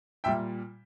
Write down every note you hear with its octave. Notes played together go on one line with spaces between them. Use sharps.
A#2 G3 E5 G5